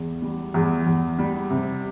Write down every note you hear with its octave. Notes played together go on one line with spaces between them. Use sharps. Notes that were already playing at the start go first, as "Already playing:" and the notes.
Already playing: E2
G3
E2
E2
G3
C3